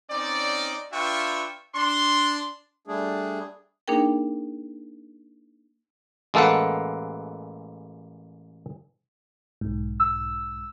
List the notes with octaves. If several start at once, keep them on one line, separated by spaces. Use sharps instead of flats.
C4 C#4 D#4 D5
D4 F4 B4 E5 G5 C#6
D4 C6
G3 A3 D4 G#4
A#3 D4 D#4 G#4 A#4 G5
A1 G#3 A#3 A4 B4 F#5
B1 G#2
E6